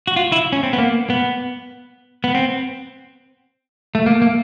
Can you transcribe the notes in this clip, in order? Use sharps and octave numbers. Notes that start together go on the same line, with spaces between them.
F#4
F4
E4
C#4
C4
B3
A#3
B3
B3
C4
A3
A#3
A#3